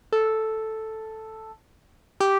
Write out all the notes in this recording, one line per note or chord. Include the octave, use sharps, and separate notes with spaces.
A4
G4